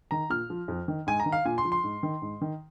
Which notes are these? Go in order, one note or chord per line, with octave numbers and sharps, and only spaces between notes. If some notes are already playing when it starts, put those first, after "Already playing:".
D#3 A#5
A#2 F6
F3
F2
D#3
G#2 G#5
A#5
D#3
F5
A#2 G#5
C6
F3
C6
G#2
D#3
G#2
D#3